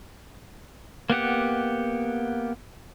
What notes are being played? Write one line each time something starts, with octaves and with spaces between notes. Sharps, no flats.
A#3 B3 G4 F#5